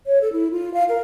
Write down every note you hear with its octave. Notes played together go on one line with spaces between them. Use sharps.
C#5
A4
E4
F4
F5
A#4